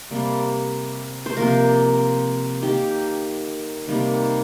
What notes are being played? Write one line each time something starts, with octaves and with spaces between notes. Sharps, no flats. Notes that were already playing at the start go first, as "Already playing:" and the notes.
C3 G3 A#3
C5
C3 F3 A#3 A#4
D#3 A#3 G4
C3 D#3 G3 A#3